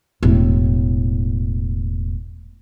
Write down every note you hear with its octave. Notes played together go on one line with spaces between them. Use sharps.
E1 A2